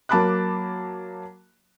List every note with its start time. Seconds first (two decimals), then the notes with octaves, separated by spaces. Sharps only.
0.09 F#3 A#3 A5 B5 D6 F#6